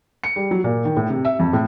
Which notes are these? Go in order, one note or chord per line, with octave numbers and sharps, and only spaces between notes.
C#7
G3
F#3
A#2
D#3
A2
C3
E5
F2
A2